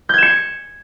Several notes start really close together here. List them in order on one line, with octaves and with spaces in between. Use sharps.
G6 G#6 E7 C#7